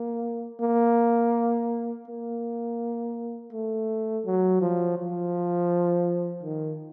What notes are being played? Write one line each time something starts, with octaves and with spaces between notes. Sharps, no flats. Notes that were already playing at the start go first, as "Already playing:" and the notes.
Already playing: A#3
A#3
A#3
A3
F#3
F3
F3
D#3